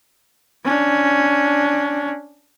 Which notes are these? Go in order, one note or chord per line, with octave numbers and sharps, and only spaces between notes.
C#4 D4